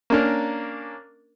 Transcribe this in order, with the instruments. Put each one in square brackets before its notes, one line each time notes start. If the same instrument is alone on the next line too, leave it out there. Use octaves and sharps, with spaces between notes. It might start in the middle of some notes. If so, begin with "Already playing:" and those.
[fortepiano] A#3 C#4 D4 A#4